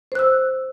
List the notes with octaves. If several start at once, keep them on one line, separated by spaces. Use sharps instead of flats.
C5 E6 F#6